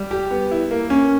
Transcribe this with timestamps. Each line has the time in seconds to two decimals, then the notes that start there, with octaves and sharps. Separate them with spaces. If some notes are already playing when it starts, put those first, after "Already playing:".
Already playing: G3
0.11 G4
0.31 B3
0.51 E4
0.71 A#3
0.90 C#4